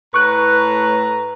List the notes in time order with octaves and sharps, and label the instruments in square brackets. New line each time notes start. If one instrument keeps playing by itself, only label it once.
[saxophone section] A2 B4 [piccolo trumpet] A#5 [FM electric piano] C#6 F#6